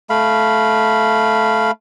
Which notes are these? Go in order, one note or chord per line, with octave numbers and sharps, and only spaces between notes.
A3 F5 B5